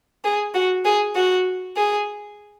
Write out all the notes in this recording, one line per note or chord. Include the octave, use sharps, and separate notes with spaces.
G#4
F#4
G#4
F#4
G#4